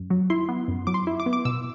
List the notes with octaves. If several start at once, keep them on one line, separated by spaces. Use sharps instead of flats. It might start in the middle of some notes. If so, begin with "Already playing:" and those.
Already playing: F#2
F#3
E4 C6
B3
F#2
F#3 D6
C6
E4
D6
B3
D6
B2 E6